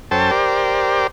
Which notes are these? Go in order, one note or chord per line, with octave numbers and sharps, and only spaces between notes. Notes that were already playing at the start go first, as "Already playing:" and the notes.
F#2 C#4 A4 C5 G5 A5
G4 A#4 C5 D5